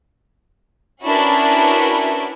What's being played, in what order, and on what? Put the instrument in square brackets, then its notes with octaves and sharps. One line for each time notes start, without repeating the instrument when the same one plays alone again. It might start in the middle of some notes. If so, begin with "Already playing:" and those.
[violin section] C#4 D4 E4 F#4 A#4 B4